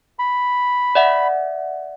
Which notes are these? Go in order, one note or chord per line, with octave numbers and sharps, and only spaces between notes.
B5
D5 E5 F#5